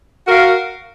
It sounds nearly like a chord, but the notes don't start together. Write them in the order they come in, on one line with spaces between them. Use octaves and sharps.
F#4 A#4 F5